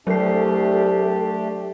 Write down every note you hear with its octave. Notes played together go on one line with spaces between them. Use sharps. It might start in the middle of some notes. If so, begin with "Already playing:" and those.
C2 F#3 A3 D4 G4 A4 C7